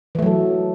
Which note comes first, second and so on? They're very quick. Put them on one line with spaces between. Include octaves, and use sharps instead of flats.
E3 A3 F#3 A4